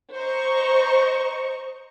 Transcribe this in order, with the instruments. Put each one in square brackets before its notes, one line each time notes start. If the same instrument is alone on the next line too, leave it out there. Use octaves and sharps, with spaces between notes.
[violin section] C5 D#5 A#5 C#6